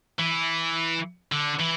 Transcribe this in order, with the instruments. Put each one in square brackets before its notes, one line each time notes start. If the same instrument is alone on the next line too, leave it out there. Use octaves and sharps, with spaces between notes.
[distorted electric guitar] E3
D3
E3